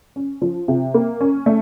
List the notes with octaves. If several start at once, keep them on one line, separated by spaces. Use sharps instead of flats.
C#4
F3
C3
A#3
C#4
A3